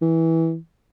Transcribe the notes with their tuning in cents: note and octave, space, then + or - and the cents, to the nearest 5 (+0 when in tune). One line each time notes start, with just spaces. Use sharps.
E3 -15